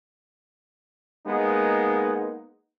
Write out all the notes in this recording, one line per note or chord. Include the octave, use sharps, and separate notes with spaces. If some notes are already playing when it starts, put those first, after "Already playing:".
G#3 A#3 B3 D#4